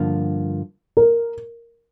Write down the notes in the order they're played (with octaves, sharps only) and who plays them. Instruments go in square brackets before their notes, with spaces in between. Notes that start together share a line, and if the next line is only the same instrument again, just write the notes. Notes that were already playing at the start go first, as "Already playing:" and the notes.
Already playing: [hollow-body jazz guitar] G2 D3 F3 A#3 F4
[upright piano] A#4